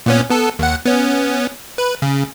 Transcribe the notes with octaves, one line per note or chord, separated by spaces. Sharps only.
A#2 B3 C#4
B3 A4
D#2 F#5
B3 C#4
B4
C#3